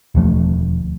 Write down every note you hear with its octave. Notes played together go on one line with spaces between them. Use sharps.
E1 D2 F3 A3